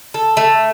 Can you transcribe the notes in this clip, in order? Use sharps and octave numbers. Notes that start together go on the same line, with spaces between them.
A4
A3